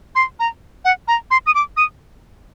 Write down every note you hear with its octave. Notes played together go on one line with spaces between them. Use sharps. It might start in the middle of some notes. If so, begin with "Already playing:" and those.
C6
A#5
F#5
A#5
C6
D#6
D6
D#6